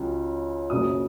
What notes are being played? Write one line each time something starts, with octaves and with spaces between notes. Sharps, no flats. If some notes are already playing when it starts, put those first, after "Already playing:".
Already playing: C#2 C#3 F#3
F#1 F#2 C#3 F#3 D#6